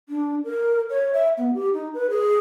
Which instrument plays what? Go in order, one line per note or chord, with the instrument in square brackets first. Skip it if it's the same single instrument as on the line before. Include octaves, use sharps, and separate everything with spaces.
[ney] D4
A#4
C#5
E5
B3
G4
D#4
B4
G#4